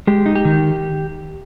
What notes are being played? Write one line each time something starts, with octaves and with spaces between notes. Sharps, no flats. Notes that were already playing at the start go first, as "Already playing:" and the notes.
G#3 G4
D#4
G4
D#3